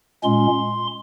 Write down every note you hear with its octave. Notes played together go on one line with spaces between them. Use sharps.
A#2 G#3 C#4 C6